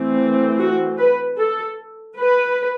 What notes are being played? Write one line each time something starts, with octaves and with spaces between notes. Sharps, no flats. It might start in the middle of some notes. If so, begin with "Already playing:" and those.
Already playing: E3 A3 C4
F#4
B4
A4
B4